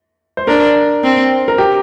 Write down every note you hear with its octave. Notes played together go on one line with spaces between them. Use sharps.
C5
D4 A#4
C4
A#4
G4